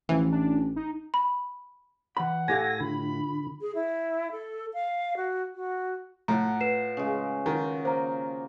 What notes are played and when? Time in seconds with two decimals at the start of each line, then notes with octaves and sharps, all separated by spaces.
0.09 A1 E3 F3
0.32 D4
0.76 D#4
1.14 B5
2.17 E3 F#5 B5
2.48 A2 G4 A4 F5 G#5 A#6
2.81 D3 F4 B5
3.61 G#4
3.75 E4
4.32 A4
4.74 F5
5.17 F#4
5.55 F#4
6.28 A2 F4 F#5 A#5
6.61 B4 C7 E7
6.97 C#3 G#3
7.46 D#3 F4 F#4
7.85 A#3 C5 A#5